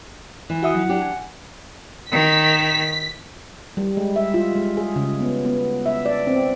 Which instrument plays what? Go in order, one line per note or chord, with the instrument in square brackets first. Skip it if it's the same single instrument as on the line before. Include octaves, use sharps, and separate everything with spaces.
[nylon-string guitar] E3
[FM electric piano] F#4 E5 D#6 [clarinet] F#5
[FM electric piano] F#3 E4
[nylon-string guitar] D4 G4
[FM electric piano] G#5
[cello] D#3 [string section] B6
[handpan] G3
G#3
E5
F4
G#3
G#4
C#3
B3
B3
E5
D5
C4